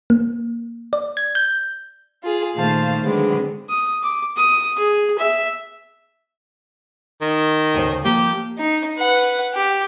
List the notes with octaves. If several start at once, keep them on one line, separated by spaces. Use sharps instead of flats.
A#3
D5
G#6
G6
F4 G#4
A#2 D#3 A3 C5 F5 A5
D3 F#3 G#3 B3 C4
D#6
D6
D#6
G#4
E5
D#3
D2 C#3 C5
F3 A#3 G4
D#4
B4 F#5
G4